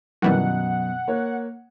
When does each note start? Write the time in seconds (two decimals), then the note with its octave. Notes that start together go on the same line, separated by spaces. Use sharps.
0.22 F#2 B2 D#3 E3 G3 F#5
1.08 A#3 C#5